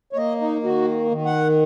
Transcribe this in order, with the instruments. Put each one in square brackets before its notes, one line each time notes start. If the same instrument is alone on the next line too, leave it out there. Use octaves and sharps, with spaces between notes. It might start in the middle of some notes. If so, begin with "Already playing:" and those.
[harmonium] C#5
A#3 D#5
D#4
D#3 F#4
D#3
F#5